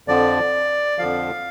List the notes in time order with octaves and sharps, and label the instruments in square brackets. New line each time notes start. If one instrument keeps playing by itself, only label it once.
[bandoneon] F2 D3 F3 D5
F2 D3 F3 F5